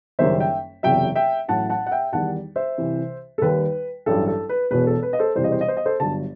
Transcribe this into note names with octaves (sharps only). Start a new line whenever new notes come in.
F#1 F#2 D#3 G3 C5 E5
E5 G5
F#1 E2 C3 F#3 E5 G5
E5 G5
A1 A2 F#3 F#5 A5
F#5 A5
F#5
E5 G5
E2 D#3 G3 F#5 A5
C5 E5
C2 C3 E3
A4
D#2 D#3 G3 B4
A1 G2 F#3 A4
A4
B4
E1 E2 B2 B4
A4
B4
D#5
A4 C5
E1 E2 C3 E3 G3 C5
D#5
C5
D#5
C5
D#5
A4 C5
G1 G2 F#3 A5